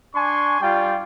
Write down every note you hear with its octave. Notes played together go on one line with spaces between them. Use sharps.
D4 G#5 C6 C#6
G3 F4 D5 G5